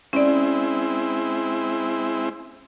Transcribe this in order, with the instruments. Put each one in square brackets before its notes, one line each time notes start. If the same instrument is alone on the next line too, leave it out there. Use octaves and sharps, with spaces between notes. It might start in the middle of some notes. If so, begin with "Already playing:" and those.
[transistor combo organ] G#3 C4 E4 [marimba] C#4 D5